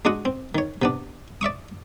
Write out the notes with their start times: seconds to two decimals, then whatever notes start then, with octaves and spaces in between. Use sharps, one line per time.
0.05 G#3 D4 F#4 D#5 F#5
0.25 C4
0.55 D#3 C#5
0.82 C3 B3 D4
1.41 D5 E5 C#6 D#6